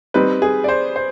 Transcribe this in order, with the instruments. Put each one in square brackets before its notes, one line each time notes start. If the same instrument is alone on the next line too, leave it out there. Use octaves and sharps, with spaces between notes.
[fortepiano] G3 C4 D#4 [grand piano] B4
[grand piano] G#4
D5
C5
C5